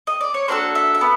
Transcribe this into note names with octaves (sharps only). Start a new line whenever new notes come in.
D#5
D5
C#5
A#3 D4 F#4 A4 C5
E5
E5
B3